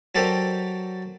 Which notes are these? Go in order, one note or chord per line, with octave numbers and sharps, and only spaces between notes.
F#3 G4 A4 A#4 C5 D5